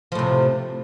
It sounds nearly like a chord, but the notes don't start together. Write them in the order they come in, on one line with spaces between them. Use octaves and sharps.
F3 A2 C3